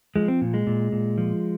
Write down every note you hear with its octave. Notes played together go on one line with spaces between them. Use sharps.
F3 G#3
C4
A#2
G#3
A#2
A#2
F3